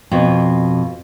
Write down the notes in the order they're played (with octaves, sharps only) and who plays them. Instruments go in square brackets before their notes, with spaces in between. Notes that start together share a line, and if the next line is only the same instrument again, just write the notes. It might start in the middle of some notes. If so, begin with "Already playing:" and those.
[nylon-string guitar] F2 B2